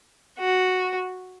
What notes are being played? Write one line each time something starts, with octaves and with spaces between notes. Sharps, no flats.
F#4